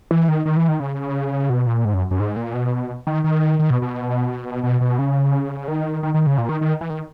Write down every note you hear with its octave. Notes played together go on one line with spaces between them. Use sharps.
E3
D#3
D#3
E3
D#3
C#3
B2
A#2
G#2
F#2
F#2
G#2
A#2
B2
D#3
D#3
D#3
B2
B2
B2
B2
C#3
D#3
D#3
D#3
C#3
A#2
D#3
D#3
E3
D#3